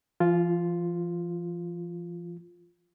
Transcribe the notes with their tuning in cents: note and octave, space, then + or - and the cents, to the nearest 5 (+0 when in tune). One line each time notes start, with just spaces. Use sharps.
F3 -45 F4 +0